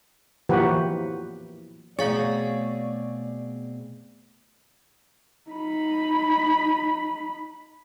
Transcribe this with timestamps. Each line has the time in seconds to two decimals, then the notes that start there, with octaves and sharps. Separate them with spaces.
0.49 E3 F3 A#3 F#4 G4 B4
1.99 B2 A3 C4 G#4 C#5 D5 F5 A6
5.50 D#4 B5